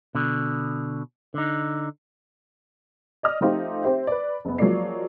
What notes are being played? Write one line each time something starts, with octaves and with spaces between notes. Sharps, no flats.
B2 D3
D3 D#4
D5 D#5 F6
F3 A3 C4 D#4 F4 G4
C4 G4 C5 E5
B4 D5
F#1 B3
F3 F#3 G#3 A#3 D5 C7